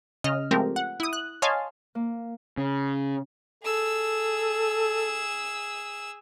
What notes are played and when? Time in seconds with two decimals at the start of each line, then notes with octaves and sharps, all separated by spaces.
0.24 C#3 D#5 F6
0.51 F3 G#3 A3 C4 G4 A#4
0.76 F#5
1.00 E4 D#6
1.13 F#6
1.42 C#5 D#5 F5 G#5 A5 C6
1.95 A#3
2.58 C#3
3.63 G#4 A4 E6